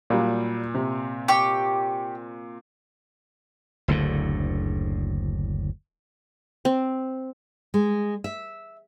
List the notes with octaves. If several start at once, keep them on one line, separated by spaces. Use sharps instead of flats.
A#2 F#3 G3 A#3
C3
G4 C#6
F#1 D2 A2 D3
C4
G#3
E5